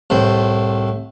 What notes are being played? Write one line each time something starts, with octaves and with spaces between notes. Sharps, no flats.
C2 A2 C5